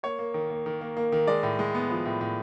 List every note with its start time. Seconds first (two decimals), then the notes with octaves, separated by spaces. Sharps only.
0.03 A#3 C#5
0.19 A#3
0.34 D#3
0.50 A#3
0.66 D#3
0.81 A#3
0.97 A#3
1.12 D#3
1.27 G#3 D5
1.43 A2
1.59 G#3
1.75 B3
1.90 F3
2.05 A2
2.21 A2